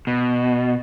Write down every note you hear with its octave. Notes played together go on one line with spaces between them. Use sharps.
B2